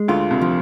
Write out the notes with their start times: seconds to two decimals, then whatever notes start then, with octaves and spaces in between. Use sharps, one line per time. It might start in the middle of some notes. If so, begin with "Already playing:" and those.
Already playing: G#3
0.08 D2 D3 F4
0.31 C2 C3
0.41 F3